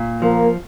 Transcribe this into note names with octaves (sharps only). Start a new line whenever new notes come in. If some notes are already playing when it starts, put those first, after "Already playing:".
Already playing: A#2
F3 A#3